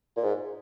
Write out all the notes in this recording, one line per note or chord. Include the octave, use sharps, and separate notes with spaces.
A#2
G#2